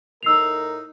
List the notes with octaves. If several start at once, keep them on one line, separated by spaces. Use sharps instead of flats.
A2 D#4 A#4 E6 C7 F7